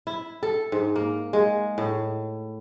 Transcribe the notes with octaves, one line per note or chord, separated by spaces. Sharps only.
E4
A4
G#2
A#3
G#3
A2